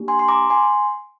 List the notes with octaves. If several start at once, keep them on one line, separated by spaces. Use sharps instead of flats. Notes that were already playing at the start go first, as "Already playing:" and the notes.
Already playing: A#3 D4 G4
G#5 C6
C6
A#5 D6
G#5 C6